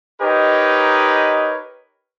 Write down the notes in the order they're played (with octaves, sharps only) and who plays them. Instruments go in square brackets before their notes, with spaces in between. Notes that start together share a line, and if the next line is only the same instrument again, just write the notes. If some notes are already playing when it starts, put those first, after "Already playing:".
[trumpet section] D#4 G4 A#4 B4 C#5 D#5